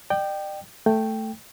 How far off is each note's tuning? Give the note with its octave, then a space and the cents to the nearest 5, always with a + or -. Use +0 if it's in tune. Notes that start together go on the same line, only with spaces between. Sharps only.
D5 +45 G5 -5
A3 +0 G5 +0